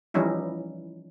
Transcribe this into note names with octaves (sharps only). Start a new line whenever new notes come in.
E3 F3 G3 C#4 D#4 E4